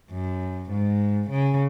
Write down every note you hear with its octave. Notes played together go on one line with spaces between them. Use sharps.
F#2
G#2
C#3